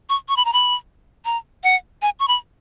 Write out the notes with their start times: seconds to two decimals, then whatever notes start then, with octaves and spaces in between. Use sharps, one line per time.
0.09 C#6
0.29 C#6
0.36 B5
0.45 A#5
0.53 B5
1.25 A#5
1.64 F#5
2.02 G#5
2.20 C#6
2.28 B5